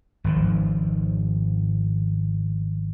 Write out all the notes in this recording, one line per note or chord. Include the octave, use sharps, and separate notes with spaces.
G#1 G#2 D3 F3